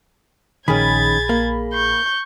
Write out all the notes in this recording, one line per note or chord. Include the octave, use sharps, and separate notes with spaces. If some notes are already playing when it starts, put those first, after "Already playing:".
A#1 D#3 C#4 G#4 B5 G#6 A6
A#3
C#6 G6